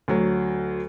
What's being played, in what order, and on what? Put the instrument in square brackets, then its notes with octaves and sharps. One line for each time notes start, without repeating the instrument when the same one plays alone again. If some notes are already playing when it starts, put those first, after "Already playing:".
[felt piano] D2 F#3